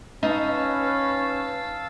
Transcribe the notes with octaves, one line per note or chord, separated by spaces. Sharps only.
C#4 D#4 B4 F5 A5 E6